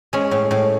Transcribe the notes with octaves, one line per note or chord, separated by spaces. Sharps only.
G#3 C#4
A2
A2